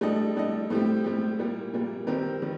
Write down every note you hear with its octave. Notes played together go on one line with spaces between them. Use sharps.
A2 G3 D4 A4 D#5
A2 G3 D4 A4 D#5
A2 G3 C4 G4
A2 G3 C4 G4
A#2 G3 A#3
A#2 G3 A#3
D#3 G3 C4 G4 A#4
D#3 G3